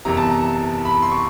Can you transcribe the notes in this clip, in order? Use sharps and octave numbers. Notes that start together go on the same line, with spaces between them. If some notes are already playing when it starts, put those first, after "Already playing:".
F#1 E2 C3 A#5
A5
A#5
B5
C6
C#6